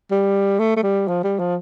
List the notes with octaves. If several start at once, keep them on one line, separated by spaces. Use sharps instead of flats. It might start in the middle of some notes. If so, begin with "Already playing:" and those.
G3
A3
A3
G3
F3
G3
F3